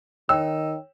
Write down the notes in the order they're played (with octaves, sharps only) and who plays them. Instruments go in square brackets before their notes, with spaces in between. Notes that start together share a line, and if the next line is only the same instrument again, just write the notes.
[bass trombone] D#3 [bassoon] D#4 [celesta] C#5 G5 [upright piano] E6